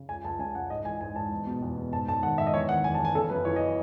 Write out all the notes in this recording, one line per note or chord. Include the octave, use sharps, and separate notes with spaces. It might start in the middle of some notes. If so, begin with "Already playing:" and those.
Already playing: C#3
C#2 G#5
C#2 A5
C#3 G#5
C#2 F#5
G#2 D#5
E3 G#5
G#2 G#5
G#2 A5
E2
B2
E2
B2
G#2 A5
G#2 A5
D#3 F#5
G#2 E5
D#5
E2 C#5
D#3 F#5
E2 G#5
A5
E2
G#5
C#3 A4
F#2 B4
E3 C#5
D#5